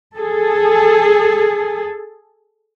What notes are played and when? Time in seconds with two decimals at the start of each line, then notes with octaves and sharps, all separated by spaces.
0.16 G#4 A4